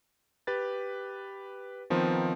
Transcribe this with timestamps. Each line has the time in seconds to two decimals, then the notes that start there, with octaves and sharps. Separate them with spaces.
0.47 G4 B4 A6
1.90 D#3 F3 B3 C4 D#4